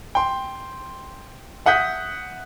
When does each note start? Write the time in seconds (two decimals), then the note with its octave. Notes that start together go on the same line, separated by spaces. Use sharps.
0.15 G5 C6
1.66 E5 F#5 D#6 G6 B6